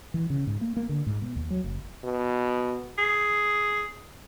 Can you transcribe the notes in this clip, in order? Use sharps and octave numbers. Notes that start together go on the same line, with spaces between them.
E3
C#3
G#2
A#3
A#3
D3
G#2
B2
D#2
F#3
F#1
B2
G#4